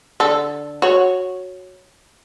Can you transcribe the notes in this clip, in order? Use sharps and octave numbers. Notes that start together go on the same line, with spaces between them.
D3 A4
F#4 C#5